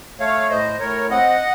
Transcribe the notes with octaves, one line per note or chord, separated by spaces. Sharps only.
A3 C#5 F5
A2 C5 D#5
A2 A#4 C#5
C4 D#5 F#5